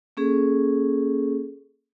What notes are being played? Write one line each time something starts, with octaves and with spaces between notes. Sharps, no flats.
A#3 C#4 G#4 A4